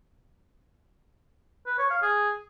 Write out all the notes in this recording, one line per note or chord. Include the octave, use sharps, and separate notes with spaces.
B4
C#5
F5
G#4